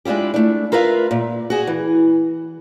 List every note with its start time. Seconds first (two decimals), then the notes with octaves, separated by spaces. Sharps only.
0.05 G#3 D4 E4 F4 G4
0.34 A3 D4
0.72 F4 A#4 B4 E5 F5
1.11 A#2
1.50 F#4 G#4
1.67 E3